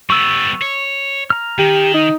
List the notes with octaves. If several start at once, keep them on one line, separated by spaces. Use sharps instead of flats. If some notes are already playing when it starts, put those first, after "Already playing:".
G3 B3 C#6 E6
C#5
A#5 F6
D#3 G4
D#4